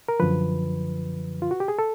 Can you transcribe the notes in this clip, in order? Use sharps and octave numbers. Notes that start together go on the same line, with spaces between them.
A#4
F#2 D3 F3 B4
F4
F#4
G4
G#4
A4